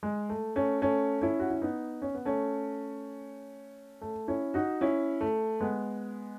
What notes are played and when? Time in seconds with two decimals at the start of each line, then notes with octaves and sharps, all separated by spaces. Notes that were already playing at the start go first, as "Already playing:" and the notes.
0.03 G#3
0.29 A3
0.56 A3 C#4
0.82 A3 C#4
1.22 C#4 E4
1.39 F#4
1.50 E4
1.62 B3 D#4
2.02 C#4
2.14 B3
2.25 A3 C#4
4.01 A3
4.28 C#4 E4
4.54 D#4 F#4
4.81 C#4 E4
5.21 A3
5.61 G#3 B3